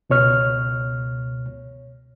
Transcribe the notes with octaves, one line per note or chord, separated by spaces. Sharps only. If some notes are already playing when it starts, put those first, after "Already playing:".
C#2 B2 C#5 F6